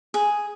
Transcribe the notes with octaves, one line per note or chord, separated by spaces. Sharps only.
G#4